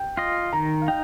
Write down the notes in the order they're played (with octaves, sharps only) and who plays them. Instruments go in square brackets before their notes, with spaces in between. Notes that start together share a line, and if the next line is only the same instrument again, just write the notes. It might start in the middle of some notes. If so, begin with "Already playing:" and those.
Already playing: [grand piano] G5
[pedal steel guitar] F4 D#5
[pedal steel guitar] D#3 [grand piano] A#5
[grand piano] F5
[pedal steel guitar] D#4 [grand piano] G5